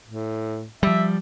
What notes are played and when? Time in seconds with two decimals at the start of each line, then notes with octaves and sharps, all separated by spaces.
0.06 A2
0.83 F3 G3 E5